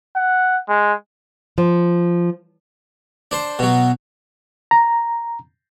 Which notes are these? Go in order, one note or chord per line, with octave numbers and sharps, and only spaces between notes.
F#5
G#3
F3
D4 C5
B2 F#3
A#5